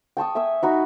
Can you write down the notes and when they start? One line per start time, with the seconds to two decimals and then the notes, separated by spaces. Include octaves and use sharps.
0.17 G5 A5 C#6 D#6
0.35 E5 G#5 D#6 E6
0.63 D#4 F#4 B5